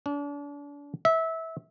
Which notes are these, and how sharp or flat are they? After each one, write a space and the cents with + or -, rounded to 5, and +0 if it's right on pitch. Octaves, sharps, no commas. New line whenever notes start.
D4 -35
E5 -20